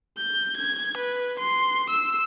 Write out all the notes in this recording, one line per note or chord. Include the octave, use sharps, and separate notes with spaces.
G6
G#6
B4
C6
E6